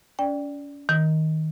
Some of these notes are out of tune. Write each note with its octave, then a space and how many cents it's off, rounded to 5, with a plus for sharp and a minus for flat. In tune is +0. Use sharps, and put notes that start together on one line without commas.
C#4 +40 D5 +0 G5 +10
D#3 +15 D#6 +45